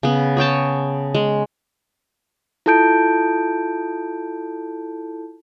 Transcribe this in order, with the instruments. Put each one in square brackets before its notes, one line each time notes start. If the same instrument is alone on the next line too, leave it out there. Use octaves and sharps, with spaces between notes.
[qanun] C#3 B3
G#4 C#5 G5 A5
G#3
[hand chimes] E4 F4 A4 A5 G6 D7